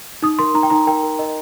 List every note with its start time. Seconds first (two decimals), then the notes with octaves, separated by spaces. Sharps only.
0.22 D#4 D#6
0.39 A#4 C6
0.54 D#4 A#5
0.63 G5
0.70 D#4 A#5
0.87 A#4 G5
1.03 A#4
1.19 A#4 D#5